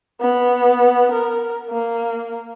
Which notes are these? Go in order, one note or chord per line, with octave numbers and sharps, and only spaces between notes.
B3
A#4
A#3